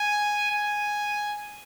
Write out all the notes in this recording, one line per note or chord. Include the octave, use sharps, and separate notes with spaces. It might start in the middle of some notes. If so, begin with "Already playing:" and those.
Already playing: G#5
G#5